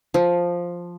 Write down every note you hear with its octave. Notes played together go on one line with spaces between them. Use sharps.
F3